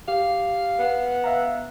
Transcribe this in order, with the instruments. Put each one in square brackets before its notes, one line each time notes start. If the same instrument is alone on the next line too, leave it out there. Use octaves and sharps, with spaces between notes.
[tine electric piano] G4 [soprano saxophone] F5
[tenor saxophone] B3
[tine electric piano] E5 F5 A#5